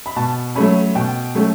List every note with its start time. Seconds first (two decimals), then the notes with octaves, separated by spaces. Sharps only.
0.06 B5
0.16 B2 A5
0.56 F#3 A3 C#4 B5
0.95 B2 G5
1.35 F#3 A3 C#4